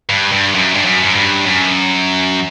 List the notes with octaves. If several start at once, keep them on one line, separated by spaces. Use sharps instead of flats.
G2
G2
F#2
G2
F#2
F#2
G2
F#2